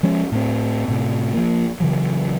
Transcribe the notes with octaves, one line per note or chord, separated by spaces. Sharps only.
F3 G#3 C#4
A2 C4
A2 C3
F3 A#3
C#3 E3 F#3